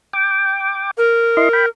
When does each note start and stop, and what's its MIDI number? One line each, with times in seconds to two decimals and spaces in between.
0.13 0.91 79
0.13 0.91 86
0.97 1.68 70
1.37 1.49 64
1.37 1.49 75
1.37 1.49 84
1.53 1.66 79
1.53 1.66 83